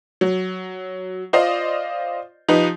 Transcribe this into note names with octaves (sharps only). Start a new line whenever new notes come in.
F#3
F4 C5 D5 D#5 F5
F3 D#4 G4 B4